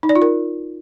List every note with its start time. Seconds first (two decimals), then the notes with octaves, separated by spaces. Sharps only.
0.03 D#4
0.09 D5
0.15 F4
0.22 A#4